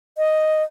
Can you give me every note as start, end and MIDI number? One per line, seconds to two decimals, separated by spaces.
0.18 0.63 75